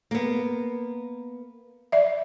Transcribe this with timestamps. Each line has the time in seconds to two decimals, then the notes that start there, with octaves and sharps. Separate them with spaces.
0.11 A#3 B3
1.92 D5 E5